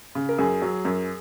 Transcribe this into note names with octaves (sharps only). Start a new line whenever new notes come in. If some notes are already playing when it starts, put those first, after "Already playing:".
C#3
A#4
F#2 G#4
F#3
F#2